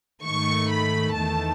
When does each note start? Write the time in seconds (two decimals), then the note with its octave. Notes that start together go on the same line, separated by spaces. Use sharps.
0.24 G#2 D#3 A3 C#6
0.71 B5
1.16 E2 D#3 A3 A5